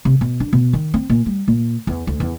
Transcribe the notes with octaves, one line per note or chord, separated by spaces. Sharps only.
C3
B2
D4
B2
D#3
C4
A#2
G3
A#2
E2
D2
E2